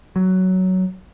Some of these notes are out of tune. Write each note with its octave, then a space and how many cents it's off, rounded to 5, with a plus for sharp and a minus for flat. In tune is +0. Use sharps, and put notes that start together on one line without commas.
F#3 +10